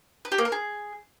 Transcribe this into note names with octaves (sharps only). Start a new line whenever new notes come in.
B4
G4
A#3
A#4
G#4